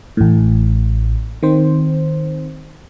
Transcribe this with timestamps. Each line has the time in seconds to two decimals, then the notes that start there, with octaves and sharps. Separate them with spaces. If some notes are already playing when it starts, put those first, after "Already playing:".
0.17 A1 A2
1.43 D#3 C4 C5